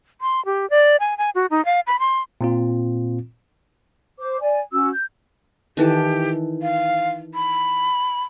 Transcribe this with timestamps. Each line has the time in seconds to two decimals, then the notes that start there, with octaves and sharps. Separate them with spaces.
0.21 C6
0.45 G4
0.70 D5
1.00 G#5
1.18 G#5
1.35 F#4
1.51 D#4
1.65 F5
1.87 B5
1.99 C6
2.41 A#2 C4 F4
4.20 C5 D6
4.40 D5 G#5
4.72 C#4 F#4 E6
4.93 G6
5.77 D#3 E3 G4 A4
6.62 F5
7.34 B5